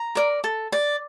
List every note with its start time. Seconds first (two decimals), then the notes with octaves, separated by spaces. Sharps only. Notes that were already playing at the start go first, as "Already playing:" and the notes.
Already playing: A#5
0.15 A#4 D5
0.44 A4
0.72 D5